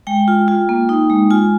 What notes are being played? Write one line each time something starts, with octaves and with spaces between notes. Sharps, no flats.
G#3 G5
F4
F4
A#3
D#4
G#3
F4 G#5